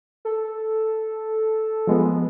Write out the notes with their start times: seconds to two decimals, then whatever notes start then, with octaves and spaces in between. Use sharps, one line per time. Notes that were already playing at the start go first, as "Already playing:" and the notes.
0.25 A4
1.87 F3 G#3 B3